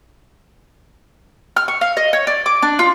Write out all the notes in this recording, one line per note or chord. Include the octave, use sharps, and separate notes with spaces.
F6
C#6
F5
D#5
C#5
D5
D6
D4
F4